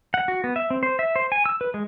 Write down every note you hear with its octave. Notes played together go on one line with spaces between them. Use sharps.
F#5
F#4
B3
E5
C4
C5
E5
C5
G#5
E6
B4
G#3